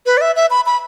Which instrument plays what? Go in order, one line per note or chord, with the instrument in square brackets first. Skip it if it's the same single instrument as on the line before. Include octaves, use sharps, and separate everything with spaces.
[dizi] B4
D5
E5
E5
B5
B5